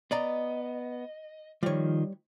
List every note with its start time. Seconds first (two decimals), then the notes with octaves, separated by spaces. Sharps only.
0.11 B3 D5 D#5 A#5
1.63 D#3 F3 G3 C#5